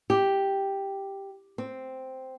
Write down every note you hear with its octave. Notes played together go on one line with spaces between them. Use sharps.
G4
C4